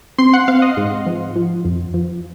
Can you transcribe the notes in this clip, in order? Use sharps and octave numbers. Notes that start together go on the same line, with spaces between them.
C4 C6
F#5
C4 F5
D#5
G#2
F3
F3
F2
F3